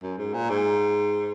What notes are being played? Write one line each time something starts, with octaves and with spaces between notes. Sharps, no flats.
F#2
G#2
A#2
G#2